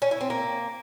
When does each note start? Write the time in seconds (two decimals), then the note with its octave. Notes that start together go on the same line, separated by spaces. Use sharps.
0.02 C#4
0.11 E4
0.21 C4
0.30 A#3